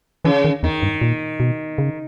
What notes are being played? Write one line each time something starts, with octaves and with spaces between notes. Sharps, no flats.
C#3 E3
D#3
E2 D#3
G2
A#2
B2
C#3